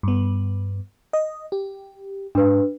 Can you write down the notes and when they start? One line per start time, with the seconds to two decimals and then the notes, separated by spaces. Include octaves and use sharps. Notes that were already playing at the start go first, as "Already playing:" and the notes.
0.03 G2 B3
1.13 D#5
1.52 G4
2.35 G#2 D4 B4